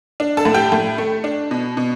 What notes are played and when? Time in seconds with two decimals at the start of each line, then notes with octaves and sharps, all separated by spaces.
0.20 D4
0.37 A4 A5
0.45 A2
0.54 G4 G5
0.72 A2
0.98 A3
1.24 D4
1.51 B2
1.77 B2